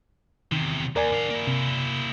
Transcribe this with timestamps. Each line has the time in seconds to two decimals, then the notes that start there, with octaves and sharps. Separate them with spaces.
0.52 E2 C3 D#3
0.96 D#2 A#4 D5 G#5
1.12 D4 F5
1.31 A#3 E4
1.47 C3